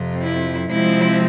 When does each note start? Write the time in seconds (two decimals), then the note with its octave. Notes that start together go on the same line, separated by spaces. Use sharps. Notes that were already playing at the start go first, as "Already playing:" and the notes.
Already playing: F2 C3 F3
0.21 E4
0.70 C3 F3 G#3 C4 E4